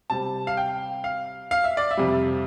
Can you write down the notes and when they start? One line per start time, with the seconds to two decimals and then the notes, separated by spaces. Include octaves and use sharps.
0.10 C3 G3 C4 A5
0.47 F5
0.57 G5
1.04 F5
1.51 F5
1.64 E5
1.77 D5
1.91 E5
1.97 F2 C3 G3